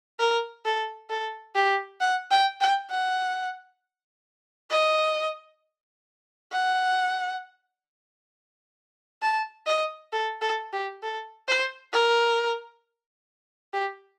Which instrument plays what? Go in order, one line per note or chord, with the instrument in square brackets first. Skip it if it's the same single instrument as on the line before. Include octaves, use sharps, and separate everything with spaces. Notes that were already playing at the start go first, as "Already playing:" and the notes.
[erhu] A#4
A4
A4
G4
F#5
G5
G5
F#5
D#5
F#5
A5
D#5
A4
A4
G4
A4
C5
A#4
G4